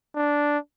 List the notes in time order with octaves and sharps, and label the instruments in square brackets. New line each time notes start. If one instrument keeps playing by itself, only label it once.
[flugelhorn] D4